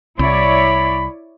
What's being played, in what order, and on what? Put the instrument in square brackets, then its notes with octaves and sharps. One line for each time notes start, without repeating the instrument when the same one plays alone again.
[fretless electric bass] C2 [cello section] E4 C#5 D5 [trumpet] B5